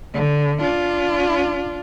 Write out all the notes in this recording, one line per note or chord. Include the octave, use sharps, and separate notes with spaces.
D3
D4 F4